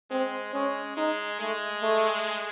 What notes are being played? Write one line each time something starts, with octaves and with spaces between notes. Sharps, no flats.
G#3 C4
G#3 C#4
G#3 D#4
G#3 A3
A3